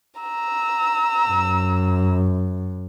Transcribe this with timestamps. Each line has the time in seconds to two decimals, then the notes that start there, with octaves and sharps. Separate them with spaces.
0.20 A#5 E6
1.29 F#2